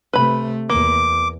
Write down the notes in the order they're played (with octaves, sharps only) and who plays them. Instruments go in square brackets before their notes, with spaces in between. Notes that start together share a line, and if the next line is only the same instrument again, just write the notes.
[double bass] C3 A3 [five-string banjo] B4 B5
[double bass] E2 [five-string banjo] A#3 [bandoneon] D6